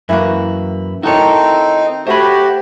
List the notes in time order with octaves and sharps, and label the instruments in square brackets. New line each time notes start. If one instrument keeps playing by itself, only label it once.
[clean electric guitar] F#2 E4 [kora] E3 A#3 F#4
[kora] D#3 F#4 [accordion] C4 D#4 [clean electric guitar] E4 A4 C#5
[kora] A3 C#5 [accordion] F#4 G4 [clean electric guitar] C5 B5